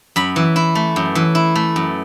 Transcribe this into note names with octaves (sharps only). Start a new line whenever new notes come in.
F#2 B5
E3
E4
A3
F#2
E3
E4
A3
F#2